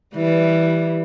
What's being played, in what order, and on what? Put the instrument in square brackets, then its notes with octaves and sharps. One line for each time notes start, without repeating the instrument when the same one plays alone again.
[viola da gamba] E3 G3